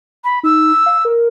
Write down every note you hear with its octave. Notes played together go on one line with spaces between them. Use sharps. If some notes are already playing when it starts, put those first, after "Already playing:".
B5
D#4 E6
F5
A#4